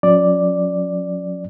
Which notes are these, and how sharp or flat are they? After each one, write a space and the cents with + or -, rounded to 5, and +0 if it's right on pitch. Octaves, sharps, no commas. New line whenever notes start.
F#3 -45 C#4 -5 D5 +0